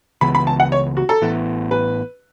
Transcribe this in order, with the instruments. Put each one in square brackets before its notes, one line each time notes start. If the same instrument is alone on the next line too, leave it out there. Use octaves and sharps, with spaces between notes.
[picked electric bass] C#2 C#3 E3 B3 [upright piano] B5
[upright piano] B5
A5
F#5
C#5
F#4
A4
[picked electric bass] A1 A2 E3 B3
[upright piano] B4